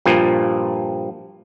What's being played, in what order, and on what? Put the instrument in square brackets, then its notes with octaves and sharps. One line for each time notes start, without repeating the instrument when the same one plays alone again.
[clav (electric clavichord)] G2 A#2 F3